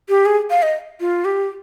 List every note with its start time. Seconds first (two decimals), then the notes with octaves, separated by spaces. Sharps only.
0.09 G4
0.26 G#4
0.50 F5
0.63 D#5
1.00 F4
1.25 G4